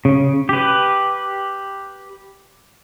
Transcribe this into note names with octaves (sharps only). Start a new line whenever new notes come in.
C#3
G4 B4